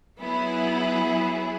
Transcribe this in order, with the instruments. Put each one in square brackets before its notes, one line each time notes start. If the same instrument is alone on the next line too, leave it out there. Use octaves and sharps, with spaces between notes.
[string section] F#3 B3 E4 G#4